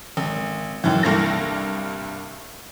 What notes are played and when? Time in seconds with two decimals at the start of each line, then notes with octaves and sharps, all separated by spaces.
0.17 G#1
0.84 F#2 D#3 E3
1.03 C2 G2 A#3 A4 A#6